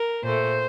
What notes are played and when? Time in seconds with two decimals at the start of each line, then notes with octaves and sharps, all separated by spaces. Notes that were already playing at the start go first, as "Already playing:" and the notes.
Already playing: A#4
0.24 A#2 A3 C5